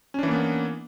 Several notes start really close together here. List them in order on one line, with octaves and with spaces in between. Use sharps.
C#4 D4 E3 A#3 B3